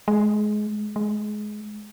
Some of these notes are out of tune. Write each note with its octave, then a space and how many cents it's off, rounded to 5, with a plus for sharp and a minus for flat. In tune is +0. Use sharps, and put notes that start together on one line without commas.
G#3 +20
G#3 +20